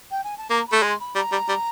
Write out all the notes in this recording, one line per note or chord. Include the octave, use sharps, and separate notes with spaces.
G5
G#5
A5
A#3 A#5
B5
A3
G#3 C6
B5
G3 A#5
G3
G3